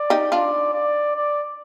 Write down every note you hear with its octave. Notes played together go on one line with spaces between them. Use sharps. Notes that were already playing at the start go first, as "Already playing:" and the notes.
Already playing: D5
D#4 G4
D4 F4 D5
D5
D5